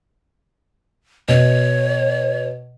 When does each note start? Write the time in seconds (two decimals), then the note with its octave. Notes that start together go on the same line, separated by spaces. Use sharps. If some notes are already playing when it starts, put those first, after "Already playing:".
1.28 B2 C#5